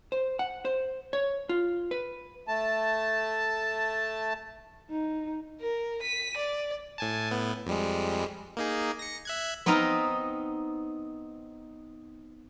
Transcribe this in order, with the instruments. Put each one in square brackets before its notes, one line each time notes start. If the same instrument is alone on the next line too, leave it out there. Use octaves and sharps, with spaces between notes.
[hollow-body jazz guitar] C5
F#5
C5
C#5
F4
B4
[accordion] A3 A5
[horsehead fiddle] D#4
[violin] A#4
B6 D#7
D5
[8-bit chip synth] A2 G#5 A5
A2 B3
F2 G3 G#3
A#3 D#4 G#4
A#6 C#7
E5 F#6 G#6
[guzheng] B3 C4 D#4 D#5 F5 A#5